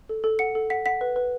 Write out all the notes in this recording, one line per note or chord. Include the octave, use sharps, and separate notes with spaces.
A4
A4
F#5 C#7
A4
F#5 B6
F#5 B6
B4
B4